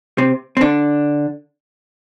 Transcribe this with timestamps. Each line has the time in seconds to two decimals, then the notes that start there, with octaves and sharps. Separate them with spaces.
0.18 C3 C4
0.57 C4
0.61 D3 D4